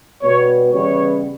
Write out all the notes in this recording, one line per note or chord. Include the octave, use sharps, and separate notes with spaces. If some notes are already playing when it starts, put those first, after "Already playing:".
B2 G3 B3 C#5
C#3 E3 G3 B3 C#5